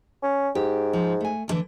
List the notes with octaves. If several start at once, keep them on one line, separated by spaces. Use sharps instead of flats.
C#4
G#2 G4
F3
A3 G#5
D#2 D3 E3